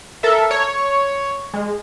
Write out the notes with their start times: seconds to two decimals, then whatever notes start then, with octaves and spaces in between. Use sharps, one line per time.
0.23 A4 A#4 E5
0.51 C#5
1.54 G#3